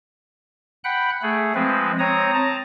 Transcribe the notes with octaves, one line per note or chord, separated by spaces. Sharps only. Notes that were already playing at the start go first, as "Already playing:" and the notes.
F#5 G5 B5 F#6
A3 G#4
F3 G#3 C4 B4
C4 C#5 A#5 D#6
A5 A#5